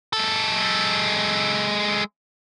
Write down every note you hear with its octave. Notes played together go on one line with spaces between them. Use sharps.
G#3 A4